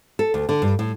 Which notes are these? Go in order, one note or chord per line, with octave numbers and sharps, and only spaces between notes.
A4
D2
D3
G2
A2